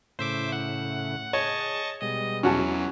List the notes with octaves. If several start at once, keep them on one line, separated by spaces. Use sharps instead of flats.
A2 C#3 E4 C5 E5 D6
F#5
G#4 C#5 D#5 A5 C#6
B2 G3 G#3 D#5
E2 E3 F#3 C#4 F#4 A5